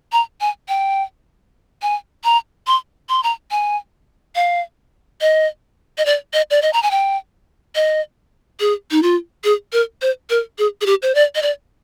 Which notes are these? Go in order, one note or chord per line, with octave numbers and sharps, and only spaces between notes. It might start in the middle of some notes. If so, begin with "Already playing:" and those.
A#5
G#5
G5
G#5
A#5
C6
C6
A#5
G#5
F5
D#5
D#5
D5
D#5
D5
D#5
A#5
G#5
G5
D#5
G#4
D#4
F4
G#4
A#4
C5
A#4
G#4
G#4
G4
C5
D5
D#5
D5